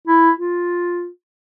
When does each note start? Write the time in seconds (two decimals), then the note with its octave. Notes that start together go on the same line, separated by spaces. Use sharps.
0.07 E4
0.39 F4